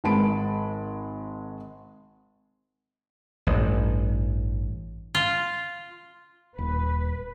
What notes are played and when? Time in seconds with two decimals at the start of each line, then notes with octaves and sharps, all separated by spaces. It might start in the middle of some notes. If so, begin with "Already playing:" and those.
0.04 G#1 G#3 A5 B5 D7
3.47 A1 G2
5.15 F4
6.58 D#1 B4